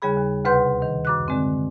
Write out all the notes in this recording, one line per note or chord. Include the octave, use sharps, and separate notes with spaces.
D#2 C#3 G3 G#4 B5
D#2
D2 C3 B4 F#5 C6 G6
D#3
F#2 D6 F#6
D3 G#3 C4